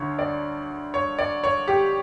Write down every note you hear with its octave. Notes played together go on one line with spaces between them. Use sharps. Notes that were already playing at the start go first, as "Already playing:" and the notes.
Already playing: D2 D3 C#5
D5
C#5
D5
C#5
G4